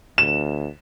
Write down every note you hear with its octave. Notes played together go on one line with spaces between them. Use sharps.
D2 E7